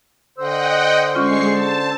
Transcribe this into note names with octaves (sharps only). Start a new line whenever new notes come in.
D3 C5 D#5 F#5 G5 E6
G#3 C#4 F4 C#6 C7
A5